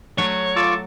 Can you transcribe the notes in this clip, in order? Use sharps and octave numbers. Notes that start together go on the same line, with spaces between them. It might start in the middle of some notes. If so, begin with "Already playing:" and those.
F#3 A3 F#4 C#5
F4 A4 C#6 D6